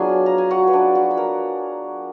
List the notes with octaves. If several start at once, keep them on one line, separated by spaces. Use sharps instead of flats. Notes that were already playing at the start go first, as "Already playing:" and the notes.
Already playing: F#3 B3 D4 F4 G#4 G#5
A#5
G#5
F#4 F#5
B4
D4 D5
F#4 F#5
B5
A#4 A#5